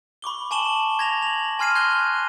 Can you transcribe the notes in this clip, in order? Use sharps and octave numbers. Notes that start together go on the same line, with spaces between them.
B5 C#6 D6 G7
G#5 A5 C#6 E7 F#7 G7
G#6 A#6 F7
F7 F#7
G#5 C6 F6 G#6 C7 D#7
F#6 G#6 A#6 C7 G7